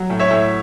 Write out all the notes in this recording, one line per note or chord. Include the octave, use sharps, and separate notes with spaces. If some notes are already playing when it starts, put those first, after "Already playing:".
Already playing: F#3
A2
C#5 E5
A2